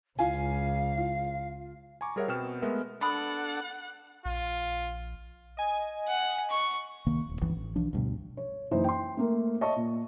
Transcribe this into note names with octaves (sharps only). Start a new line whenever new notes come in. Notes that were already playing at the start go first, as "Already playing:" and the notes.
C#2 F4 F5 G#5
F4
G#5 A#5 C#6 D6
G3 G#4 A#4 C#5 E5 F#5
B2 B3 C4 G5 F6 E7
G#3 A3 B3 A#4 B4 E5
D4 A4 F#5 A5 B5 D#6
A#1 F4
D#5 G#5
F#5
C#6
C2 D#3 A#3
D#1
G1 C#2 E3
A1
B1 E3 F3 D4
D2 G2 B2
C#5
F#1 E3 D#4 C5
G5 C6
A3 A#3 A#4
C#5 D#5 E5 A5 C#6
A#2